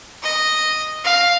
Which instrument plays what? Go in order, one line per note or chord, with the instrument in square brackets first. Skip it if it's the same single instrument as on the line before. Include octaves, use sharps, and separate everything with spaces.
[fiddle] D#5
F5